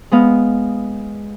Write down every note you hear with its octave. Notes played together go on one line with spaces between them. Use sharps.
G#3 B3 F5